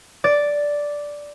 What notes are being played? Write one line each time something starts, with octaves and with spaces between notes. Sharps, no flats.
D5